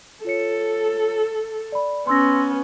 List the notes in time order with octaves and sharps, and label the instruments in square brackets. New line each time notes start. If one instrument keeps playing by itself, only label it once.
[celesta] F4 C#5 C#7 [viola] A4
[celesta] D5 B5
[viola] B3 C#4 [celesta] C6 E6 A#6